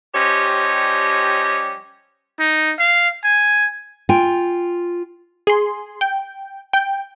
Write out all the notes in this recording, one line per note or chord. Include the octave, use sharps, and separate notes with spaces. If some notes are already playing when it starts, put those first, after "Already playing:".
F3 G3 C#4 G4 C#5 D#5
D#4
F5
G#5
F4 G5 G#5
G#4 C6
G5
G5